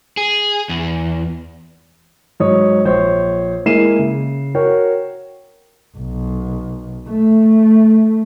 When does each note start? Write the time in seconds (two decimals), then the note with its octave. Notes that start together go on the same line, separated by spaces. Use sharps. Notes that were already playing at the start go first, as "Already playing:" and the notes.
0.17 G#4
0.69 E2
2.40 G#2 F#3 C#5 D#6
2.85 A#1 C5 C#5
3.66 G#3 A#3 E4 C7 D#7 E7
3.99 C#3
4.55 F#4 A#4 C#5 G5
5.97 B1
7.09 A3